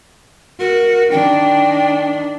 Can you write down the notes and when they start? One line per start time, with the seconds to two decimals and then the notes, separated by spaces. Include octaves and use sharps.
0.60 F#4 A#4
1.11 D#3 D4 G5